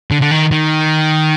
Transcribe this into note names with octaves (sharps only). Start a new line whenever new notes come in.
D3
D3
D#3
D#3